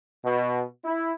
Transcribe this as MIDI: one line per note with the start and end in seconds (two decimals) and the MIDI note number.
0.24 0.61 47
0.83 1.11 64